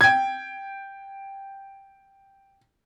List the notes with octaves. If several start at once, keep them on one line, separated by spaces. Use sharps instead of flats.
G5 G#6